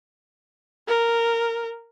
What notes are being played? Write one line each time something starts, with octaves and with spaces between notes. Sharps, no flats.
A#4